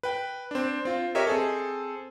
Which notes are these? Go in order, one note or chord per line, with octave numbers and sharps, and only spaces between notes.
B4 G5
C4 D4
C4 F4
G4 A#4 C#5 D#5 E5
C4 G#4 A4